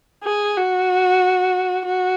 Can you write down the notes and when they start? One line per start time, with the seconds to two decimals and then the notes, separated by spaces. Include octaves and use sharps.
0.24 G#4
0.57 F#4
1.85 F#4